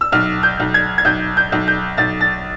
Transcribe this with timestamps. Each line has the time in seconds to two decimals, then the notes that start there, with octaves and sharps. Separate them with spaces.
0.01 E6
0.12 B1 F6
0.43 G6
0.60 B1
0.74 G#6
0.98 G#6
1.05 B1 G6
1.37 G6
1.52 B1
1.68 G6
1.97 B1 A6
2.21 A6